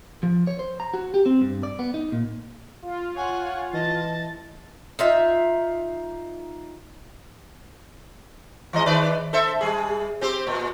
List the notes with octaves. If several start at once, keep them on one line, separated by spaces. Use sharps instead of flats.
F3
C#5
C5
A#5
F#4
G4
C4
G2
D5
B3
D#4
A#2
F4
C#5 F#5 G#5
E3 D#5 A5 A6
D#4 F4 E5
E3 G#3 D#5
D#3 B4 D5
A4 C5 E5
G3 G#4
C4 G4 C5
A#2